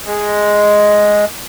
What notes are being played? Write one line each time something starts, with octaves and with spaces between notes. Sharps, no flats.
G#3